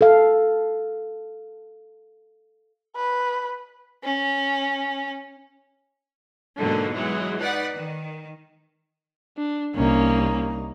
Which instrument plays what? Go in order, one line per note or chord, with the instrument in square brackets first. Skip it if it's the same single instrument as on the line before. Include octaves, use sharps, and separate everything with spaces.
[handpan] A4 F5
[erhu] B4
[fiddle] C#4
[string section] G#2 B2 D3 F#3 A#3
E3 F#3 G#3
D#4 B4 D5 F#5
D#3
[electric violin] D4
[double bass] C2 D#4 [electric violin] A#3 C#4